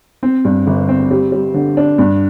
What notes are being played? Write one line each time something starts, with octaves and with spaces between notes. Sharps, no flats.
C4
G2
G1
C4
G3
G3
D3
D4
G2